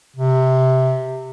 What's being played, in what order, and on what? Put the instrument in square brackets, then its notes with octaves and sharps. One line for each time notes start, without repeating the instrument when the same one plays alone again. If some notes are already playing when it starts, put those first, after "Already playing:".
[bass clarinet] C3